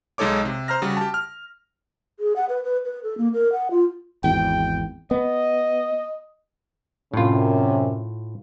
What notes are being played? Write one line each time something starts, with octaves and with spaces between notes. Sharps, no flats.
B1 G#3 D#4 A4 C#5 D6
C3
C5 A#5 F6 A#6
C#3 G3 F#4
G4 A5
F6
G#4
F#5
B4
B4
B4
A4
A#3
A#4
F#5
F4
G#1 E2 G5
B3 D#5
F#2 A2 C3 C#4 F4